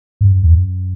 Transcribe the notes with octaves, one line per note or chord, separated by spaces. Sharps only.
G2
F#2
E2
F#2